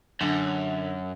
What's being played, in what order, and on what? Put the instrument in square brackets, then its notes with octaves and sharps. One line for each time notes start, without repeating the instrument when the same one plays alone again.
[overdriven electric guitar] F#2 [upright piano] D3